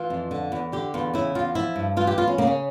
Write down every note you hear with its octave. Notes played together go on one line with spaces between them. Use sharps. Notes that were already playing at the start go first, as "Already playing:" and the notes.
Already playing: E3 F4
F2
D3
E2
D3 G4
E2 F4
C#3 E4
E2 F4
F3 E4
G2
E3 F4
G4
E2 F4
C#4
C#3 A#3
C#4